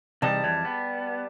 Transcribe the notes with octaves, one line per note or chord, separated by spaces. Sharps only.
C3 E3 G3 D#4 A5
F2 E3 C#5
B3